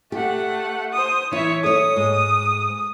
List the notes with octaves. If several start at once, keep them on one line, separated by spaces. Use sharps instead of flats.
A3 G4 F#5
C5 D#6
E3 E4 C#5 E5
A4 C#5 D#6
G#2